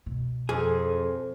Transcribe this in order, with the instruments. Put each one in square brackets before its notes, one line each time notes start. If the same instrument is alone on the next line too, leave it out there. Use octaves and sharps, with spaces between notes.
[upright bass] B2
[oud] F2 [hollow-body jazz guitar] G#4